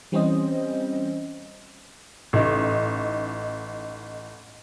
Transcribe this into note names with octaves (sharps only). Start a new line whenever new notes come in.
E3 G3 C4 C#4 C5 D#5
A1 D#4